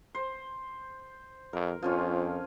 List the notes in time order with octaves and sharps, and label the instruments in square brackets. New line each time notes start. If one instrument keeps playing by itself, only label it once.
[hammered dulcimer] C5
[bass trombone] F2 [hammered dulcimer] A#4
[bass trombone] F2 [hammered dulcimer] F3 C#4 F4